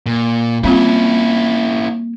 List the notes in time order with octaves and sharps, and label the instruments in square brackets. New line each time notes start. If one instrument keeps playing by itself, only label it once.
[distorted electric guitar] A#2
[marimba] G3 C4 F4 [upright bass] A#3 [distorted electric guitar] C#4 E4